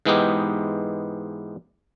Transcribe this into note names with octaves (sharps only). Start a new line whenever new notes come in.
G#2 E3 G#3 B3 D#4 G4